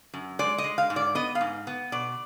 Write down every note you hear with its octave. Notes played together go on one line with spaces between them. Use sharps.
F#2
G#3 D5
D#5
G#3
F5
G#2
D5
B3 D#5
F5
G#2
B3
B2 D5